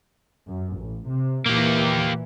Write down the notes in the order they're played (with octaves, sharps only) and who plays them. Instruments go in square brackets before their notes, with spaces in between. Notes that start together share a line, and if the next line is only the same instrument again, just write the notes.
[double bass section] F#2
A1
C3
[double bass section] A#2 E3 [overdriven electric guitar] A#3 G4